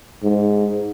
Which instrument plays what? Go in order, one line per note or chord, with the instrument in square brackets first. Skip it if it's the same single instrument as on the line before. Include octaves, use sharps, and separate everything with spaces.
[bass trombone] G#2